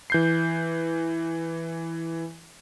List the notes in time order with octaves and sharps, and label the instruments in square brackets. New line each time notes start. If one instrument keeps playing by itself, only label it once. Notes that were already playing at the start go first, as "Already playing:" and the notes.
[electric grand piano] E3 G6 C7